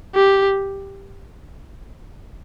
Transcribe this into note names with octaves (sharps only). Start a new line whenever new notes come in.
G4